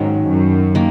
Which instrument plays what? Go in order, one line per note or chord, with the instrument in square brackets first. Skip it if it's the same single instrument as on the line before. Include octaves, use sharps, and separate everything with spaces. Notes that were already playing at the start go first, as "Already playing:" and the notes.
Already playing: [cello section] G#2 [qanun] D#3 F#3 C#4
[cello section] F#2
[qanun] D#3 A#3